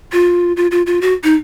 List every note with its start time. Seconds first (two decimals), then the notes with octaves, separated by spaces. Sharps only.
0.12 F4
0.57 F4
0.71 F4
0.86 F4
1.01 F#4
1.23 D#4